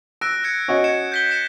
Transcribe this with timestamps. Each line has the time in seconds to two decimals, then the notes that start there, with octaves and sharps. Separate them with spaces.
0.21 E6 F#6 A#6 D7
0.44 F#6 G#6 C#7
0.68 C#4 F#4 D#5
0.84 G#6 C#7 E7
1.12 G6 B6 G7
1.31 C#7 E7